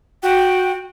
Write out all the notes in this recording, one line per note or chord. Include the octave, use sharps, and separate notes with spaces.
F#4 G5